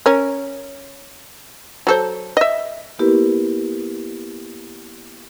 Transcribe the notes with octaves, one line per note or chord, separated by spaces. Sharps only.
C#4 A#4
F#3 A4 C5
D#5 E5
A#3 B3 E4 G4 A#4 B4